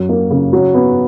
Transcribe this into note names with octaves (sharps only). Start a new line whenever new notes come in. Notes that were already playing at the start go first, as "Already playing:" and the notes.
Already playing: F#2 F#3
A#3
C#3
F#3
B3